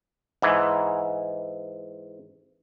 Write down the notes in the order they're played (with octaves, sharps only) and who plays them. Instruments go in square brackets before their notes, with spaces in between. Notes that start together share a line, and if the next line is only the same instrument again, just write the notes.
[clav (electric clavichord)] G#2 E3